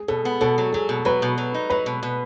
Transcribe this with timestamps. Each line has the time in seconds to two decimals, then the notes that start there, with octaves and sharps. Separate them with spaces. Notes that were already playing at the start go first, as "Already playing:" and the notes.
Already playing: G#4
0.08 B2 A4
0.25 B3
0.41 B2 A4
0.58 F#3
0.73 F#3 G#4
0.89 B2
1.05 F#3 B4
1.22 B2
1.38 F#3
1.54 D#4
1.70 F#3 B4
1.86 B2
2.03 B2